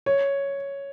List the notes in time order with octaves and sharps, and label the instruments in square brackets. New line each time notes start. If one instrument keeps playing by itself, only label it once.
[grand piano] C#5